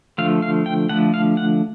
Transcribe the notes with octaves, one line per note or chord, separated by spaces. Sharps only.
D3 F3 A3 F5
F5
G5
D3 F3 A3 F#5
F5
F#5